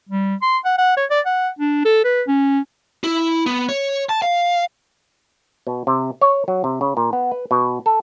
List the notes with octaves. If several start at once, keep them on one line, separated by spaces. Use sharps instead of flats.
G3
C6
F#5
F#5
C#5
D5
F#5
D4
A4
B4
C#4
E4
B3
C#5
A5
F5
B2
C3
C#5
F#3
C3
C#3
A#2
B3
B4
B2
A4